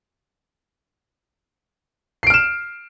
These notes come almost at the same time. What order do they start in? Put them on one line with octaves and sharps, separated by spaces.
C7 D7 F6 E7